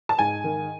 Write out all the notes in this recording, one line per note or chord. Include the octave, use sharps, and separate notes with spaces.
A5
G#2 G#5
D#3